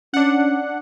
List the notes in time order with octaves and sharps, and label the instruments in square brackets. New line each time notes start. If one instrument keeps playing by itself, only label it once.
[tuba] C#4 [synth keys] D4 F#5